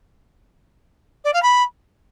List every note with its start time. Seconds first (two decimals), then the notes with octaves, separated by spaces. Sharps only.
1.24 D5
1.34 F5
1.43 B5